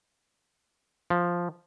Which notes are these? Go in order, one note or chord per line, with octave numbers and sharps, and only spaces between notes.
F3